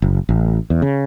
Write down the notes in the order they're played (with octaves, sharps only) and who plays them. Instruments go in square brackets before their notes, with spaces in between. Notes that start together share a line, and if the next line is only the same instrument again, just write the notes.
[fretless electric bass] F#1
A1
E2
C#3